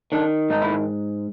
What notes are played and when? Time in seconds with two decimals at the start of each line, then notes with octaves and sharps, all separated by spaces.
0.12 D#3 D4
0.50 G#2 D#4
0.62 E4